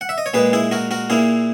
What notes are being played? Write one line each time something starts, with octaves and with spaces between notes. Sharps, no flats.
F#5
E5
D#5
C#5
A#2 G#3 G#4 B4
E4 G#4
F#4 A#4
F#4 A#4
A#2 A#3 E4 G#4